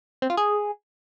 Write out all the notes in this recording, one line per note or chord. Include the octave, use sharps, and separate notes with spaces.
C4
F4
G#4